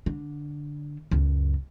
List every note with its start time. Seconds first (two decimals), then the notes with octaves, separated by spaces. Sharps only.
0.06 D3
1.11 C#2 F#2